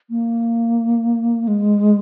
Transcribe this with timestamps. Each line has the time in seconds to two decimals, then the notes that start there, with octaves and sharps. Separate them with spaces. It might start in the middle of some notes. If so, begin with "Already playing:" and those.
0.10 A#3
1.48 G#3